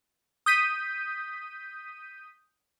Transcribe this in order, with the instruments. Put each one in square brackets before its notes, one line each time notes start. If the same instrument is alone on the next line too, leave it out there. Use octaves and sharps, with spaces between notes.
[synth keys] D#6 G6 B6 D#7